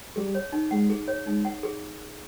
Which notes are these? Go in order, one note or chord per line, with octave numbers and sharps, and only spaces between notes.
G3 G#4
C#5
D#4
G#3 F#5
G#4
C#5
G#3 D#4
F#5
G#4